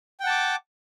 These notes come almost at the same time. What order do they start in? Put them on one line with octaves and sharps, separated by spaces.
G5 F#5 A5 D6